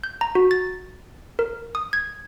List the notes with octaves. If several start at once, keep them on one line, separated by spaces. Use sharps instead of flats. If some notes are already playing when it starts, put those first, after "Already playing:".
G6
A#5
F#4
A6
A#4
D#6
G#6